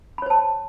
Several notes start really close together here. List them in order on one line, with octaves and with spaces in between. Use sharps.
B5 C#5 C5 A5